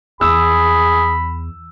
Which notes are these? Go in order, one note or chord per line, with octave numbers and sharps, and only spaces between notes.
E2 G#4 B5 E6